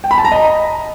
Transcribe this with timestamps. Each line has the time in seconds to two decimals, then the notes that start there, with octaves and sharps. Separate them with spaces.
0.04 G5
0.11 B5
0.18 A5
0.25 A#5
0.32 D#5